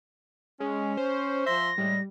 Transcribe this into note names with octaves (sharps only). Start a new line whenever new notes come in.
G#3 C#4
C5
F3 E5 C6 A#6
A2 G3 G#3